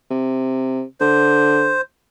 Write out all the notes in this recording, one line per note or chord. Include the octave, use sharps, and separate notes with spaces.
C3
D3 C5